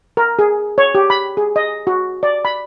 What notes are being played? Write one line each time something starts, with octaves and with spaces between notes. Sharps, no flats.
A#4
G#4
C#5
G4
B5
G#4
D#5
F#4
D5
B5